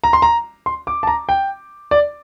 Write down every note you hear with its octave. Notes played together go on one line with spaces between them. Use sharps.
A#5
C6
A#5
C6
D6
A5
A#5
G5
D5